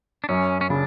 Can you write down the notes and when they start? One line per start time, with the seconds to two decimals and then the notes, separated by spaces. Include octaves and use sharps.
0.24 D4
0.29 F#2 C#4
0.61 C#4
0.70 C#3 D4